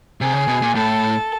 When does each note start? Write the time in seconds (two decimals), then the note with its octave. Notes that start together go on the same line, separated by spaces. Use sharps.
0.21 C3 G#4
0.34 C#3
0.48 B2
0.62 A#2
0.75 A2 A4